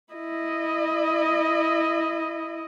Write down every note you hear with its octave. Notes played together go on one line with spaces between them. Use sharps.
E4 D#5